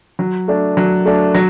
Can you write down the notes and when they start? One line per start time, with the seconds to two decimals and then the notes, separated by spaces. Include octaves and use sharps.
0.19 F#3
0.48 A3 D4
0.77 F#3
1.05 A3 D4
1.35 F#3